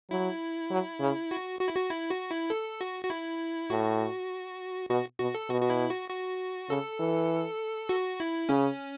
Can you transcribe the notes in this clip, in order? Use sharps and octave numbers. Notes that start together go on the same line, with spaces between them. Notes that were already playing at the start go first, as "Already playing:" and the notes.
F#3 E4
F#3
C#3
F#4
F#4
E4
F#4
E4
F#4
E4
A4
F#4
F#4
E4
A2 F#4
B2 F#4
B2 F#4
A4
B2 F#4
F#4
E4
F#4
F#4
C#3 A4
E3
F#4
E4
C#3 C#4